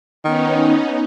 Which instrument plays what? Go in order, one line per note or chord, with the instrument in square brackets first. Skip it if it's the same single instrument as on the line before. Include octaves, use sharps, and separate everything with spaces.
[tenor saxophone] D#3 [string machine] B3 C#4 D#4